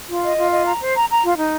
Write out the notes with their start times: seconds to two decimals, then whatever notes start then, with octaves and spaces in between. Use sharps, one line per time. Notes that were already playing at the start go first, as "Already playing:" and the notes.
0.09 F4
0.23 D#5
0.37 F4
0.51 D#5
0.66 A#5
0.81 C5
0.95 A#5
1.10 A#5
1.23 F4
1.38 D#4